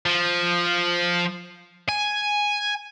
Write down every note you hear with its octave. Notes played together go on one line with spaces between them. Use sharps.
F3
G#5